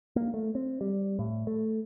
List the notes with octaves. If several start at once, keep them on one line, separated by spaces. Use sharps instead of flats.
A#3
A3
C4
G3
A2
A3